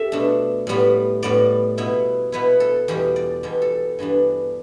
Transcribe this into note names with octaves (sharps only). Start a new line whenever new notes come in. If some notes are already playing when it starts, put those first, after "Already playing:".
Already playing: G4 A4 E5
B2 A3 D4
A2 G3 B3
A2 G3 B3 D5
B2 B3 E4
B2 B3 E4 B4
A4
E2 B2 G3 G4
D5
E2 B2 G3
A4
G2 E3 B3 D4